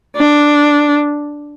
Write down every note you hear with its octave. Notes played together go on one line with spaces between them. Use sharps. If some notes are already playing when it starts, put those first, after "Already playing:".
D4